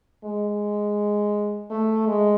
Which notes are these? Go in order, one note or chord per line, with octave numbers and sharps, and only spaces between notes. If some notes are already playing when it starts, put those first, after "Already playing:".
G#3
A3
G#3